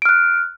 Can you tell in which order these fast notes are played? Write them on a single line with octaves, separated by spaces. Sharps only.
D7 F6 F#6